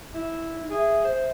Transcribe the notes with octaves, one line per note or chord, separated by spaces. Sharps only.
E4
D#4
G#4 E5
C5